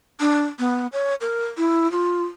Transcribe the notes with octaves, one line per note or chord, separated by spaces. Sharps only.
D4
B3
C#5
A#4
E4
F4